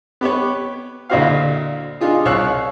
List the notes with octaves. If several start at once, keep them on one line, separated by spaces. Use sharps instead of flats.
B3 G4 B4 C#5
D2 A#2 E4 F#4 C5 F5
D4 D#4 F4 G#4
C2 C#5 F5 E6 F#6